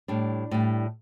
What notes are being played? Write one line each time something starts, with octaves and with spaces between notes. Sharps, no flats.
A2 G3 D4
A2 G3